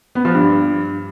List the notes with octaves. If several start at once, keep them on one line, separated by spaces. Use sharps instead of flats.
B3
F3
G2